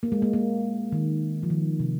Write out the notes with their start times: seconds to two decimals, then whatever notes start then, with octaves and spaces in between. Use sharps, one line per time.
0.03 A#3
0.12 G#3
0.22 A#3
0.33 A#3
0.92 D#3
1.43 F3
1.50 D#3
1.80 C3